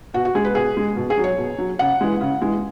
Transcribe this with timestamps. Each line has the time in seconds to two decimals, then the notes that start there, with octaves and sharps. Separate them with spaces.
0.14 B2 F#4
0.25 F#4
0.35 G#3 G#4
0.45 B4
0.55 B2 G#4
0.77 G#3
0.96 B2
1.10 G#4
1.17 F#3
1.24 C#5
1.38 B2
1.58 F#3
1.79 C#3 F#5
2.01 E3 G#3
2.21 C#3
2.42 E3 G#3